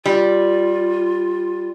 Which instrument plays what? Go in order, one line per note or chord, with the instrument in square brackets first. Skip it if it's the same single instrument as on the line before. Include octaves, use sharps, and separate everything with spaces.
[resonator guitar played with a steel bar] G3 [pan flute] F4